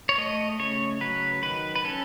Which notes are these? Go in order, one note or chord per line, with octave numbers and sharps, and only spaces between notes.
C#5
A3 D#5
C#3 C#5
F#3 B4
D#3 B4
B4
C#4 A4